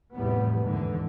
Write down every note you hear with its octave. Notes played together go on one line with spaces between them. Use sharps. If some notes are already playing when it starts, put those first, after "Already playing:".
F1 E2 A2 E3 G3 B3
D#2 G#2 D3 E3